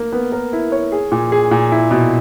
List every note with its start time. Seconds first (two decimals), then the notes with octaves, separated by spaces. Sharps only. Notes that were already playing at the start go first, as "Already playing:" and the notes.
Already playing: A#3
0.12 B3
0.32 A#4
0.53 E4
0.72 C#5
0.92 G#4
1.12 A#2
1.32 G#4
1.51 A#2
1.72 E4
1.91 B2